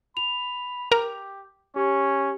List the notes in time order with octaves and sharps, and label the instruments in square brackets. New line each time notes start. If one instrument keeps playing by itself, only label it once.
[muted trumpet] B5 [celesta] F7
[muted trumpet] G4 [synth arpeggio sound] A#4
[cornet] C#4 [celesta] G4 [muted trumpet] C#5